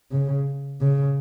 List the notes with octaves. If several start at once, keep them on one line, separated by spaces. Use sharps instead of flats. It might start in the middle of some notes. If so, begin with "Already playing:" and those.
C#3
C#3